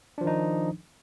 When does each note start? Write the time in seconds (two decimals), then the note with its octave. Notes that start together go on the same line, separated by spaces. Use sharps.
0.18 D4
0.21 F3
0.24 D#3
0.27 D#4